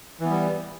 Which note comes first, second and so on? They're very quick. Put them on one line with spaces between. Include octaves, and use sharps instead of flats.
E3 B3 G3